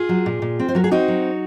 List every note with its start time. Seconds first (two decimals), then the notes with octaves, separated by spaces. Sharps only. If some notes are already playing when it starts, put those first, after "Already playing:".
Already playing: F4 G#4
0.09 F#3
0.26 A#2
0.42 A#2
0.59 C4
0.68 C5
0.75 F#3 A#4
0.84 G#4
0.91 C4 D#4 F#4
1.08 F#3